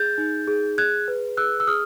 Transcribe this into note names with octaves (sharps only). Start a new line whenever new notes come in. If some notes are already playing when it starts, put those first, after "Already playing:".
Already playing: G#4 G6 A6
D#4
G#4
G#4 F#6 G#6
B4
G#4 E6 F#6
E6
G#4 D#6 F6